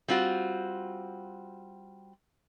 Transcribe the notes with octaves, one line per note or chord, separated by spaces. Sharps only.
G3 C4 F4 F#4